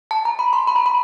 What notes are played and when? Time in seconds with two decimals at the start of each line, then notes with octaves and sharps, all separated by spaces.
0.11 A5
0.25 A#5
0.39 B5
0.53 C6
0.67 B5
0.76 A#5
0.86 B5